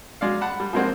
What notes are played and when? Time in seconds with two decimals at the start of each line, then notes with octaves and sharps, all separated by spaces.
0.21 F#3 G#3 D5 F5
0.41 F#5 A5 B5
0.60 G3
0.73 F3 F#3 G#3 A#3 C4 F#4